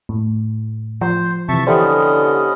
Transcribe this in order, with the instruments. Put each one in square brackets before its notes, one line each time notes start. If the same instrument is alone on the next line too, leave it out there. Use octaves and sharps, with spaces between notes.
[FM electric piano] A2
[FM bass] F3 [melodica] C5
[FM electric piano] C3 E3 [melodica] E5 A5 C#6
[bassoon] D3 [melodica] B3 C#4 D#5 [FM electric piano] E4 G4 C5